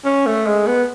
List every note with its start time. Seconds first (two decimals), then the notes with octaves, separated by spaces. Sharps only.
0.05 C#4
0.26 A3
0.47 G#3
0.67 B3